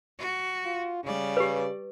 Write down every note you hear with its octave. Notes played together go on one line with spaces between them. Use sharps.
F#4
F4
C#3 G3 D5
G4 B4